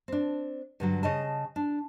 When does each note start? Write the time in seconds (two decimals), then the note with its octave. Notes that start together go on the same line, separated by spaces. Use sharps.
0.08 C4 D4
0.80 G2 D3 F#3
1.03 C#3 D#5 A5
1.56 D4